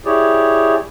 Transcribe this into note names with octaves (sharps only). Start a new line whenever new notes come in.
E4 G4 G#4 C#5 D5